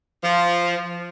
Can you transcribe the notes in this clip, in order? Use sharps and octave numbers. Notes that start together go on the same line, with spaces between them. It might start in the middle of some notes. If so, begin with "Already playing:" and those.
F3